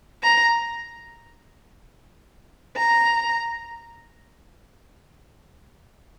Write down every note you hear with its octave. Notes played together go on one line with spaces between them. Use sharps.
A#5
A#5